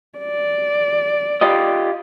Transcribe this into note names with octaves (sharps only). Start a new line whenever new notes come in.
D5
F4 G4 D#5